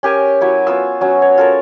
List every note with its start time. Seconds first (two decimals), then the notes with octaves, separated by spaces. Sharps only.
0.03 C#4 G4 A#4 G#5
0.41 F#3 E4 C#5
0.67 B3 F4 E6
1.01 F#3 C#4
1.22 C#5
1.38 F4 A4 A#4